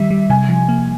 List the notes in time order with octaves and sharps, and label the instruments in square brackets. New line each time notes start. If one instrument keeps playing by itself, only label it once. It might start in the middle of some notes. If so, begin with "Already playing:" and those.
Already playing: [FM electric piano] D#3 G3 [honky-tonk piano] E5
[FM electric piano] G3
[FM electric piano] C3 [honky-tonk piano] G#5
[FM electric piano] F3
A#3